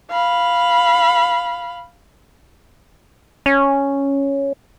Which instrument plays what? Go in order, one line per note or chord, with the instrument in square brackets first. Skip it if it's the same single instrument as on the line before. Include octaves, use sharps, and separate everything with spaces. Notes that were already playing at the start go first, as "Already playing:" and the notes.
[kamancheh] F5 B5
[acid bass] C#4